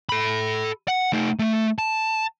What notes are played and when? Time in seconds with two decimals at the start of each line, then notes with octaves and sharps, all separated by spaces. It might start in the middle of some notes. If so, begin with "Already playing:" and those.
0.09 A4 B5
0.88 F#5
1.13 A3 D#4
1.39 A3
1.78 A5